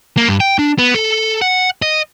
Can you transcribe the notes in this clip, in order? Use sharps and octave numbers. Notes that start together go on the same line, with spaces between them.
A#3
G2
G5
D4
B3
A4
F#5
D#5